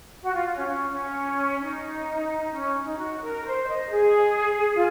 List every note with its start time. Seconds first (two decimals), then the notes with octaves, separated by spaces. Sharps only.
0.21 F#4
0.33 F4
0.55 C#4
0.67 C#4
0.90 C#4
1.60 D#4
2.52 C#4
2.82 D#4
2.97 F#4
3.21 A#4
3.43 C5
3.67 D#5
3.90 G#4
4.75 F4